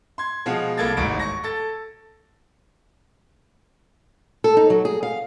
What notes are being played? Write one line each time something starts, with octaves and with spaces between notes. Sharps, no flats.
C6 G#6
B2 F3 G#3 F5 F#5
C2 A#3 A4 G#6 A6
D#1 A1 G#2 F#4 C#6 D7
C#6 A#6
A4 A6
A4
D#4
F#3
G#4
F5